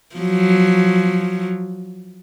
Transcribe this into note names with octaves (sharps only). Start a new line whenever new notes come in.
F3 F#3